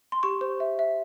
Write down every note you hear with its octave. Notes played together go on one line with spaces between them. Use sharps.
C6
G4 C#6
C5
E5
E5